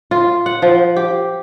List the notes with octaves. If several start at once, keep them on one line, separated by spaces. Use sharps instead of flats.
F4
F#5
F3
G4